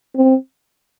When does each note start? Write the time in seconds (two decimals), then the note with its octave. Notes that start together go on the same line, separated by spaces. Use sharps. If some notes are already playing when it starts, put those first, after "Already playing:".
0.15 C4